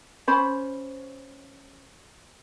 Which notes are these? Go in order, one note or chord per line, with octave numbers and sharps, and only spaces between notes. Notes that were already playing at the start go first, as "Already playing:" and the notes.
C#4 C5 B5